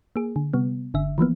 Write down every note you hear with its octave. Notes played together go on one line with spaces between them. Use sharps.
A#3 G#4
D3
C3 G3 B3
G1 D3 E5
E3 F3 A#3 B3